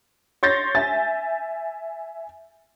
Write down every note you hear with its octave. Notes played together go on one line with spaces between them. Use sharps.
C#5 C6 G6 A6 A#6
E5 G#5 A6